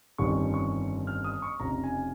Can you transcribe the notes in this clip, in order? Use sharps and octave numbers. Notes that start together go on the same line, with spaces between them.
G1 F2 D#3 G3 C#4 C#6
C#6
F6
D#6
C#6
F1 F2 C#3 A#5
G#5